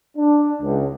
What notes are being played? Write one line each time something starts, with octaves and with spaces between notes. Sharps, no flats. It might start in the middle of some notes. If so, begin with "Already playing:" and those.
D4
C#2